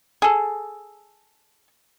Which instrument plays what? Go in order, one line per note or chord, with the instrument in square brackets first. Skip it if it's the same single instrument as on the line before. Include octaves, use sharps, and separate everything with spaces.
[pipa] G#4 A4